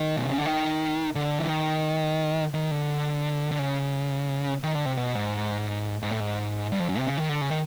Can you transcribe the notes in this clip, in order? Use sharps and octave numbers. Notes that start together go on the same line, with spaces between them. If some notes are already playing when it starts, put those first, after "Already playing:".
Already playing: D#3
B2
C3
C#3
D3
D#3
D3
E3
D#3
D#3
D3
D3
C#3
D#3
D3
C3
B2
G#2
G#2
A2
G#2
G2
F2
F#2
C3
C#3
D#3
D3
C#3
D#3